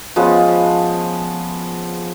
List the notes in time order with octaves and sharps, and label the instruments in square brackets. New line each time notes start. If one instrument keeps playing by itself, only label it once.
[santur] F3 G#3 B3 C#4